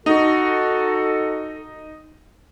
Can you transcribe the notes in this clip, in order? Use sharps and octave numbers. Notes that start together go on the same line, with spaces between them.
D#4 F#4 A4